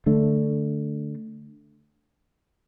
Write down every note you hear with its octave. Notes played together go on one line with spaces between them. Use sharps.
D3 A3 D4